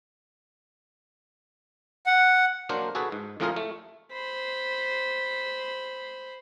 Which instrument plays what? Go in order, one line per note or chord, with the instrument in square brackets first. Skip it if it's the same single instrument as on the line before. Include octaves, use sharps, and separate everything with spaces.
[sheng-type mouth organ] F#5
[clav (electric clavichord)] F#3 A#3 D4 A#4 C5
F#4 G#4 A4 B4
G#2
F2 A2 F3 F4 G#4 A#4
A3
[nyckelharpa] C5 B5